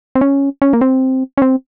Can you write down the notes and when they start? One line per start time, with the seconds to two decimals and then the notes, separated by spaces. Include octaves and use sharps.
0.15 C4
0.21 C#4
0.62 C#4
0.73 A#3
0.81 C4
1.38 C#4
1.42 C4